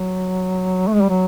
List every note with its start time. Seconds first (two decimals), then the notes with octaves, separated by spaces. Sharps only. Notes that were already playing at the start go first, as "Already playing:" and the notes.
Already playing: F#3
0.87 A3
0.94 G#3
1.02 G3
1.09 F#3